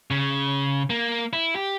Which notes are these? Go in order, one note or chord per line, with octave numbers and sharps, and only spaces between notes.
C#3
A#3
E4
G4